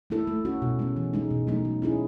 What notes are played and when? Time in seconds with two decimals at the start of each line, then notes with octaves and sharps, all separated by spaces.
0.10 A3 E4 A4
0.27 A3
0.45 C#4 F#4
0.62 B2
0.79 G#3 C#4
0.97 E3
1.13 G#3 D#4
1.30 B2
1.47 F#3 A3 D#4
1.65 A3
1.82 C#4 E4 G#4